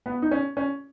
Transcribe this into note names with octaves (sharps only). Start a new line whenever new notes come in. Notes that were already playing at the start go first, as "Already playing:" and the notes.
B3
D#4
C#4
C#4